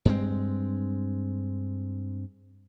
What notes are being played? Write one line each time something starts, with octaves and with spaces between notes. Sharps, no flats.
G2 G#3 C4